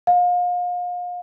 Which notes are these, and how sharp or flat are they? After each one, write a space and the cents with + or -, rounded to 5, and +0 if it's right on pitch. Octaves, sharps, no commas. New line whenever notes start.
F5 +35